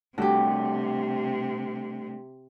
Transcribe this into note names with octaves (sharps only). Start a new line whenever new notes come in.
C3 G3 A3 D4 F#4 G4